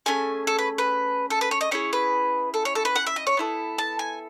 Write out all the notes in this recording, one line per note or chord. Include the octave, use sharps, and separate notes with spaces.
A3 C#4 G#4 G#5
A4
B4
B4
A4
B4
C#5
D#5
C#4 E4 G#4 C#5
B4
A4
C#5
A4
B4
F#5
E5
D#5
C#5
B3 E4 A4
A5
G#5